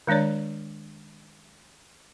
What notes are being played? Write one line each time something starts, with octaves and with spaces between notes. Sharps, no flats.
D#3 G#3 D4 C#5 D5